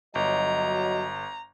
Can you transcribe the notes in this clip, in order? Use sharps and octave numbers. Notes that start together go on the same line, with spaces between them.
G1 F#3 D#5 A#5